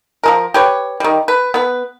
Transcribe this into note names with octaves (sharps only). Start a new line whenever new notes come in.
F3 G#3 A#4
G4 B4 C#5
D#3 G3
B4
B3 B4